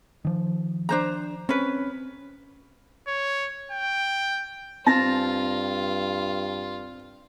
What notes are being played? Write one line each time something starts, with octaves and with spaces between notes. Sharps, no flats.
D#3 F3
D4 C5 A#5
C4 C#4 B4
C#5
G5
G2 C4 F4 A5 A#6